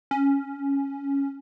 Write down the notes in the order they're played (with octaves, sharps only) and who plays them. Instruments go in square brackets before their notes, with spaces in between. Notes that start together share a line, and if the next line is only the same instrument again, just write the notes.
[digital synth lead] C#4